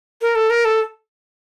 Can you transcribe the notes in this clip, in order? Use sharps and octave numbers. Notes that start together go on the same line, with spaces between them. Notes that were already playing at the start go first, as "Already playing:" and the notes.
A#4
A4
A#4
A4